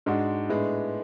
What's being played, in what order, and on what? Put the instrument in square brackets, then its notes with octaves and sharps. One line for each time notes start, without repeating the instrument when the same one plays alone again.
[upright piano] G#2 G#3 D4 F#4
A2 G#3 B3 D4